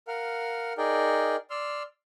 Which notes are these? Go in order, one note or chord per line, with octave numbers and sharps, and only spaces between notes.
A#4 F5 F#5
D#4 G#4 A#4 D5 G5
D5 C6 E6 F6